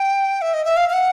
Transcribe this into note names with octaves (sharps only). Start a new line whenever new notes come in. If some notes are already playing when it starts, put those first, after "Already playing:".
Already playing: G5
E5
D#5
E5
F5
F5
F#5